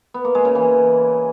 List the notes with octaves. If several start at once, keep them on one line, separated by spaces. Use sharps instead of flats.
B3
A#3
G#3
C#3
E3